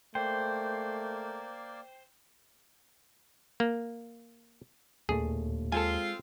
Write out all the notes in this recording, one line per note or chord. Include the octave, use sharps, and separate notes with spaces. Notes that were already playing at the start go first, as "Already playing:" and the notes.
A3 A#3 A#4 C5 D5 G5
A#3
D1 D#2 A#2 A3 G#4
G#3 C4 F4 A4 G#5